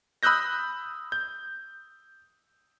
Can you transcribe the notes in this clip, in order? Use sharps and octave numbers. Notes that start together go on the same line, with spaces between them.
B5 D#6 E6 F#6 G6 A#6
G6